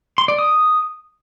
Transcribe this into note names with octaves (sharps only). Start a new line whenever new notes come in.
C6
D5
D#6